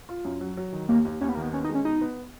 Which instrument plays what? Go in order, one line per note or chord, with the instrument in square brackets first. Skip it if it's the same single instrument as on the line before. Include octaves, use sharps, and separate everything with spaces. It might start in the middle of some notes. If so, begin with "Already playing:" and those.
[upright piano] F4
F#2
F#3
F#3
D#3
[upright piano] D#2 [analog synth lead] A#3
[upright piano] D#2
[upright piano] D#2 [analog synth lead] C#4
[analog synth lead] B3
[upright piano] D#3 [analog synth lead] A#3
[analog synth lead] B3
[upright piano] B3 [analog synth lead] C#4
[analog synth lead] D#4
[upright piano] G#3
[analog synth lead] C#4
[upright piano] B2 [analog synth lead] D#4
[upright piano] B3